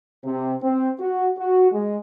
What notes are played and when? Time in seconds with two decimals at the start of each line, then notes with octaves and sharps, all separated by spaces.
0.24 C3
0.61 C4
0.99 F#4
1.37 F#4
1.72 G#3